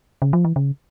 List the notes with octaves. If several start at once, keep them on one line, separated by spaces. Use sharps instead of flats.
C#3
F3
E3
C#3